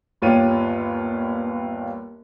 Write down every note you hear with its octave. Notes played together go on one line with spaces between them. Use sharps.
G1 D#2 F4 G4 C#5 D#7